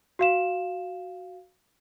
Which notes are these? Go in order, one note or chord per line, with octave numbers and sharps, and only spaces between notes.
F#4 F5 E7